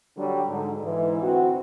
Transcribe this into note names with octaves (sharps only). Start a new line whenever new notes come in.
D3 F#3 G3 D4
G#2 D3
G#2 E3
D2 C4 F#4